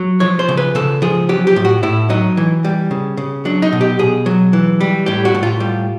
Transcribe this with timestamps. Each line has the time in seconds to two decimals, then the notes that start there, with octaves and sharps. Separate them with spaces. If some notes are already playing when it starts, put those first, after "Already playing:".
Already playing: F#3
0.20 F3 C#5
0.39 C5
0.49 C#3
0.57 B4
0.75 C#3 A4
1.02 F3 G#4
1.29 F#3 G4
1.47 G4
1.56 A2
1.65 F#4
1.83 A2 E4
2.10 F#3 D#4
2.37 E3
2.65 G3
2.91 C#3
3.17 C#3
3.45 F#3 D4
3.62 D#4
3.73 B2
3.81 G4
3.99 B2 G#4
4.26 F#3
4.53 E3
4.80 G3
5.06 A2 G4
5.25 F#4
5.35 A2
5.43 F4
5.60 G3